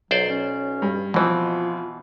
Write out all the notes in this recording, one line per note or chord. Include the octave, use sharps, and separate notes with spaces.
B1 F#3 C5 D5
C#4
G2
F2 B2 E3 C4 F4